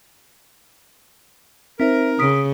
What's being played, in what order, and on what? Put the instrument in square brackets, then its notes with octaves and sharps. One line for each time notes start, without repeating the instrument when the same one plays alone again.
[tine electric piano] C4 D#4 [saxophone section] A#4 [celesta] C5 E5 B6
[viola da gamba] C#3 [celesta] D#6 B6 D7